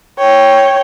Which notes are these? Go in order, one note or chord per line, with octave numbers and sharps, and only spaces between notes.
C#5 G5